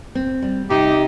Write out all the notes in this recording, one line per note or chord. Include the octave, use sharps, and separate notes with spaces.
C4
G3
C3 D#4 G4